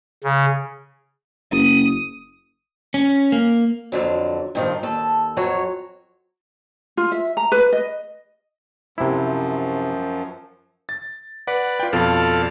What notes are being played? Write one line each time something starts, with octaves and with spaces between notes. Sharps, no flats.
C#3
F#1 D#6
C#4
A#3
F2 D3 F#3
G2 D#3 F3
D#2 A4
F2 F#3 C#5
F4
E5
A#5
B4
D#5
F#2 C3 F3 E4
A6
B4 D5 F#5
F4 G5
F2 B2 F4 A4 D5 F5